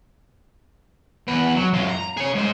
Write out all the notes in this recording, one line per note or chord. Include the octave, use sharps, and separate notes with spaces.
E2 B4
F#3
F#2 F4
A#5
G#4 C#5
G#2 C5